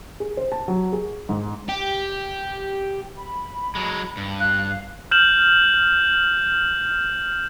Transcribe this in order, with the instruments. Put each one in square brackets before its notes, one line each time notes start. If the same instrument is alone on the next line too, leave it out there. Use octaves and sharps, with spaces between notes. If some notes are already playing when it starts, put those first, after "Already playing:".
[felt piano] G#4
C5
A5
F#3
G#4
G#2
[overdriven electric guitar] G4
[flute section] B5
[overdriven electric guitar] F#3 G#3
G2
[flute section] F5 [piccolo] F#6
[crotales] F6 G6 E7 F#7